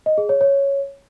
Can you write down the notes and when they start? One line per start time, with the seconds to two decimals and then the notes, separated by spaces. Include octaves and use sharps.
0.06 D#5
0.18 G#4
0.29 C#5
0.41 C#5